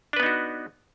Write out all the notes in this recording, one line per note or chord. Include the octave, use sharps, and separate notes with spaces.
B3 D4 D#4 F#4 B4